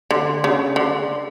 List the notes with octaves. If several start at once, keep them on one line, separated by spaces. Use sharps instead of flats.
D3
C#3
D3